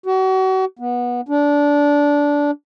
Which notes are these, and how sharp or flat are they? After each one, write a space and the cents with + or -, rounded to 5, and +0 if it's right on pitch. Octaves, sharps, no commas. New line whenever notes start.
F#4 +35
B3 -20
D4 -15